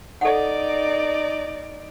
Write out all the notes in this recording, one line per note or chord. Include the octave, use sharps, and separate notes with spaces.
D#4 A4 D5 F#5